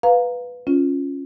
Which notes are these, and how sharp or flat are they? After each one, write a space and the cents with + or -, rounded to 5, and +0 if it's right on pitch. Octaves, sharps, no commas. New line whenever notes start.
B4 +0 F5 +15 A#5 +0
C#4 -5 F4 +0